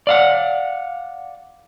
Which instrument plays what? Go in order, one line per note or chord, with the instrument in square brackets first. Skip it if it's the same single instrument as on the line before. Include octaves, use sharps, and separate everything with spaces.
[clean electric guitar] D5 F5 F#5